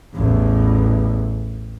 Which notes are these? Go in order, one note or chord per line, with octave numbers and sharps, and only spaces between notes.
A1 E2